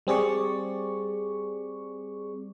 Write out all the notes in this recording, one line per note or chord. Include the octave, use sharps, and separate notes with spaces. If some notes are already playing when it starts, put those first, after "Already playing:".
G3 C4 G#4 D5 C#6